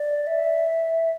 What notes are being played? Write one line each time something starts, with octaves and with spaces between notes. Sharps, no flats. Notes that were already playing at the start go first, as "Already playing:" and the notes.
Already playing: D5
E5